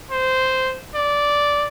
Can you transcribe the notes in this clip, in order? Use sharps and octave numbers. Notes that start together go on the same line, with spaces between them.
C5
D5